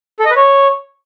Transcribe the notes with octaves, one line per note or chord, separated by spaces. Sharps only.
A4
D#5
B4
C#5